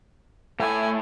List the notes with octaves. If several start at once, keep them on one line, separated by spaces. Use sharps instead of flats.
A2 A3 E4 G#5